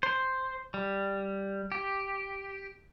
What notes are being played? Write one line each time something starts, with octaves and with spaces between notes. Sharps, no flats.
C5
G3
G4